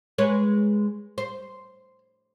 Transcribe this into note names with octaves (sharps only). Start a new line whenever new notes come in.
G#3 B4 C#5
C5